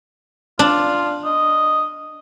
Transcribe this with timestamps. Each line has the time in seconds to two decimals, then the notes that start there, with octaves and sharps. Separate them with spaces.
0.59 D4 F4
1.25 D#5